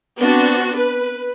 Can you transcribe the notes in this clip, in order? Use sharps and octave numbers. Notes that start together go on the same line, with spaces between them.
B3 C4 D4 F#4
B4